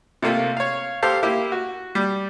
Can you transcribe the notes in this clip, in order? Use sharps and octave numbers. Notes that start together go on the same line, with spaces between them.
C3 A3 A#3 F4
C#5 F5
G4 A4 C5 F5
A#3 E4 G4
F#4
G3